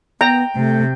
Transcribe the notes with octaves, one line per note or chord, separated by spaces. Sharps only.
B3 G5 A#5
C3 A3